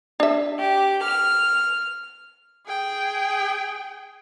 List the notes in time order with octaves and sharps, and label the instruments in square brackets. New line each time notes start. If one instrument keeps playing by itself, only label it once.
[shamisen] D4 E5
[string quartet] G4
F6
[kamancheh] G#4 G5